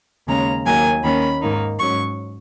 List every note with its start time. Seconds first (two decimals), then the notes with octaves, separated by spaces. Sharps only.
0.28 D#2 C#3 G#3 C#4 A#5
0.66 D#2 D#3 F#3 A#3 G#5
1.03 D#2 D#3 A#3 C#4 B5
1.41 G#2 D#3 A#3 D#4
1.79 G#2 F#3 C#4 C#6